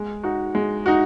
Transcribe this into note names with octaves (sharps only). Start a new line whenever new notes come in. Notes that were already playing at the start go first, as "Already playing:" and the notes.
Already playing: G#3
D#4 F#4
G#3
D#4 F#4